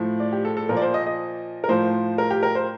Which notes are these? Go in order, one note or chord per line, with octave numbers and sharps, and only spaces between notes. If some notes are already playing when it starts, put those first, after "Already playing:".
Already playing: A2 F3
D5
G4
A4
A4
A#2 F3 A#4
D5
C5
D#5
D#5
A#4
A2 F3 C5
A#4
G4
A#4
C5